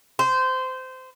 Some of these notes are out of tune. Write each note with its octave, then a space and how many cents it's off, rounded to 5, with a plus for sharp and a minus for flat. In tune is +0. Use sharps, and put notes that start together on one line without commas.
C5 -20